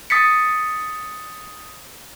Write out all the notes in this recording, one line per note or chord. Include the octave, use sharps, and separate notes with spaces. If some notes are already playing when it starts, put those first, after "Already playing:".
D#6 A6 B6 C#7